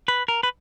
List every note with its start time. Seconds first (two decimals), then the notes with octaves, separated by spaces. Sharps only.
0.08 B4
0.28 A#4
0.43 B4